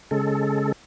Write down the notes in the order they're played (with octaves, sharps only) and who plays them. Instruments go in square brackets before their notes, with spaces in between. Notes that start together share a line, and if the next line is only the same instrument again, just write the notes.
[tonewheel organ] C#3 G#3 A4